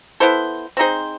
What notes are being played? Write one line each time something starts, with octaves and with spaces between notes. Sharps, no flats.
B3 E4 A4 C5
C4 D#4 G#4 C5